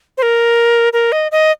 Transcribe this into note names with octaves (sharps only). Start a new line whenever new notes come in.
C5
A#4
A#4
D#5
D#5